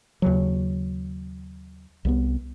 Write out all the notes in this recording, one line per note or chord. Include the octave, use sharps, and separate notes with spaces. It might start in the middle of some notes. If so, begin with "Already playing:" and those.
D#2 C#3 F#3
C2 E3 B3